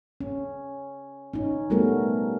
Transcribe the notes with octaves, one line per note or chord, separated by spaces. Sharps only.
C#4
C#4 D#4
G3 A3 B3 C#4 F#4 A#4